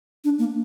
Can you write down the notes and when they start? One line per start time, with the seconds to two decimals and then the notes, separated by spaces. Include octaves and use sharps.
0.24 D4
0.39 A#3